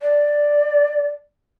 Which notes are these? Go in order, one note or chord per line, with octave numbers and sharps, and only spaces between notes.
D5